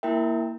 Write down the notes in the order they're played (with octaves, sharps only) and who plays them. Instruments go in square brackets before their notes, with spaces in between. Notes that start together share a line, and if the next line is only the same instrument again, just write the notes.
[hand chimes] A#3 E4 A#4 E5 G5